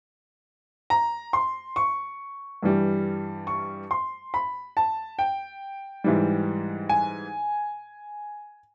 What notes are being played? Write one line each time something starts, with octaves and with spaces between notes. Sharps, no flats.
A#5
C6
C#6
G2 E3 G3
C#6
C6
B5
A5
G5
G#2 E3 G3
G#5